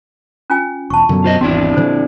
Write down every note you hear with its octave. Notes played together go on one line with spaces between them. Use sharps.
C#4 F4 G#5
E1 A5 C#6
F#2 B2 D3
F4 C5 D#5
G#1 E2 C4 D4 E4 F#4
A#2 D3 F3 C5